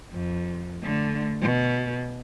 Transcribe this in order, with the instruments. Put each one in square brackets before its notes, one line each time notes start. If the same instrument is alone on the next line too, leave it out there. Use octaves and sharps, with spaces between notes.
[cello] F2
D3 A3
B2